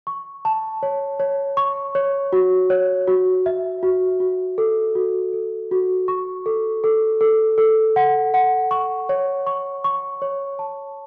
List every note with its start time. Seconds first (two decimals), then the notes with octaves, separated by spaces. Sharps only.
0.07 C#6
0.45 A5
0.83 C#5
1.20 C#5
1.57 C#6
1.95 C#5
2.33 F#4
2.70 C#5
3.08 F#4
3.46 E5
3.83 F#4
4.20 F#4
4.58 A4
4.95 F#4
5.33 A4
5.71 F#4
6.08 C#6
6.46 A4
6.84 A4
7.21 A4
7.58 A4
7.96 F#5
8.34 F#5
8.71 C#6
9.09 C#5
9.47 C#6
9.84 C#6
10.22 C#5
10.59 A5